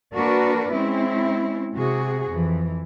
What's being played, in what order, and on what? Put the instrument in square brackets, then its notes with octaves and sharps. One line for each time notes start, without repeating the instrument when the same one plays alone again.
[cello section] A#3 D4 F#4 A#4 B4 D5
G#3 C4 C#4 E4
C3 F#4 G#4
F2 E3